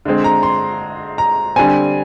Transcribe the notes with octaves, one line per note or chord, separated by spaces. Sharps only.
D3 G#3 C4
A#5
C6
A#5
D3 G3 C4 G#5